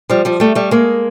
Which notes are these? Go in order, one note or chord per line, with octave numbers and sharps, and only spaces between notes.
F3 G3
F3 G3
G3 A3
G3 A3
G#3 A#3